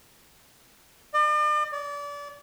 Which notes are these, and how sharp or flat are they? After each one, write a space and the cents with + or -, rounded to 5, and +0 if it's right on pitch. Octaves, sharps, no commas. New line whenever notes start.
D5 +45
D5 -30